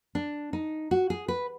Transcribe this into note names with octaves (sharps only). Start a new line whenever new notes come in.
D4
D#4
F#4
G#4
B4